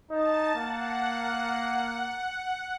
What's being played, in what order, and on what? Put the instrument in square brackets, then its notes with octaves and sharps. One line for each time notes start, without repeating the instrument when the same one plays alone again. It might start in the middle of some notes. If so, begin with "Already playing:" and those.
[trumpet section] D#4 [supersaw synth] A5 A6
[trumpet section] A#3 [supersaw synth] F#5